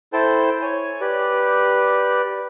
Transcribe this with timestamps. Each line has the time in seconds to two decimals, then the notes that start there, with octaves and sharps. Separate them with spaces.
0.13 E4 A4 C5 G5 A5 G6
0.62 C#5 G#5
1.01 G4 B4 D5